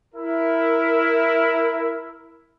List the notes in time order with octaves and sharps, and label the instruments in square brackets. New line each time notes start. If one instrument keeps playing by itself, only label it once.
[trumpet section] E4 A#4